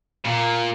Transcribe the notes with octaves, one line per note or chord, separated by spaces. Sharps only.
A#2